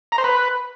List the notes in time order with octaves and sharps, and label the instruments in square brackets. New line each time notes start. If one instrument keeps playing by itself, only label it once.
[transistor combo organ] A#5
C5
B4